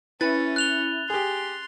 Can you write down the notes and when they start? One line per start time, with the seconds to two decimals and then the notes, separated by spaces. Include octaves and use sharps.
0.21 C#4 E4 B4 A6
0.56 F#6 F7 G7
1.10 G4 G#4 C6